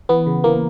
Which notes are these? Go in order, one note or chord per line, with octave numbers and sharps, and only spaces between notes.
E3 B3
C#3
E3 A#3